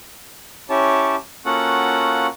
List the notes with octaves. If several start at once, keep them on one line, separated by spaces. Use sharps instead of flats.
C#4 E4 G4 C#5 A5
A#3 C#4 F4 F#4 A4 F#5